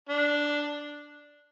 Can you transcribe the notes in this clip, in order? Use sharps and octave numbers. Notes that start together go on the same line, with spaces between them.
D4